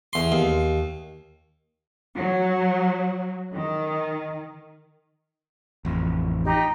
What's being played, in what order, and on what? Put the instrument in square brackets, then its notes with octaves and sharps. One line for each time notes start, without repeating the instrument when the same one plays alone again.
[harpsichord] E2 C6
D#2
[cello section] F#3
D#3
[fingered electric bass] A1 F2
[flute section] D#4 G4 A#5